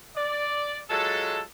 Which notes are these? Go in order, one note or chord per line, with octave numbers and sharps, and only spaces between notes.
D5
F#3 G#3 F4 A4